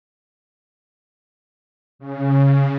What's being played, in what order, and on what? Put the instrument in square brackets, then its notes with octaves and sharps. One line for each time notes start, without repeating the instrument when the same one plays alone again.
[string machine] C#3